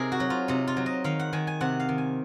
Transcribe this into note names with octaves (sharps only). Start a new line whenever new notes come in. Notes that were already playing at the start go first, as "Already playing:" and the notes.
Already playing: C3 D#4 G#4 A#4
F#4
F#3
F4
C3 D#4
F4
F#3
D#5
D#3 F5
F#5
D#3 G#5
G#5
C3 F#5
F5
D#3
G#5